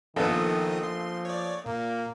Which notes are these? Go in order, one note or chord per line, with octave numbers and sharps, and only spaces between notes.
A#1 D#3 F3 A#3 B3 D#4 A4 D#6
F3 C6
C#5 D5
A#2 A#3